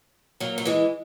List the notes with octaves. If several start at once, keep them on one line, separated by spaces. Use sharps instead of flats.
F#3 A#3
F#3
E3 G#3